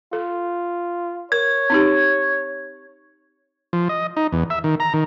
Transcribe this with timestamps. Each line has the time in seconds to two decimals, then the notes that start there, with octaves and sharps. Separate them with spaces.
0.13 F4 A4
1.32 A#4 C#5 G#6
1.70 C4 D#4 G4
3.73 F3
3.89 D#5
4.17 D#4
4.33 E2
4.50 E5
4.64 D#3
4.80 A#5
4.94 D#3